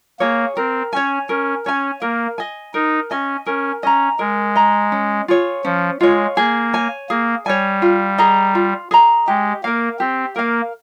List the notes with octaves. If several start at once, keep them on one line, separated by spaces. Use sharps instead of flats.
A#3 G#4 C#5
C4 A#4
C#4 C#5 G#5
C#4 A#4
C#4 C#5 G#5
A#3 A#4
D#5 G#5
D#4 A#4
C#4 D#5 G#5
C#4 A#4
C#4 D#5 A#5
G#3 A#4
D#5 A#5
C#4
F4 G#4 C#5
F3 C#4
G#3 F4 G#4 C#5
A#3 G#4
C#5 G#5
A#3 G#4
G3 C#5 G#5
F4
G#4 D#5 A#5
F4
G#4 D#5 A#5
G#3 G4
A#3 A#4 F5
C4 G4
A#3 A#4 F5